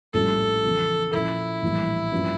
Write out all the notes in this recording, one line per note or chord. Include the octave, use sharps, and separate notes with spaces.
A#1 A2 G3 C#4 F4 A4
E2 C#3 F3
A#2 F3 C#4 E4
A#1 A2 E3 G3
G2 F3 A#3 C#4 F4